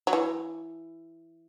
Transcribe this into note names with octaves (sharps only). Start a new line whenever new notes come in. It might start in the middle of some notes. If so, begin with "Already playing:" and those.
F#3
E3